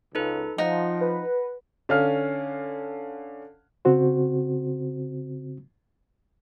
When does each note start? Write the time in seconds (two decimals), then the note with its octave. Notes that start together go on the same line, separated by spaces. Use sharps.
0.15 C#2 D#4 A4 B4
0.58 F3 D#4 F#5 A#6
1.01 B4
1.89 D3 C#4 F5 F6
3.85 C#3 C4 F#4 C5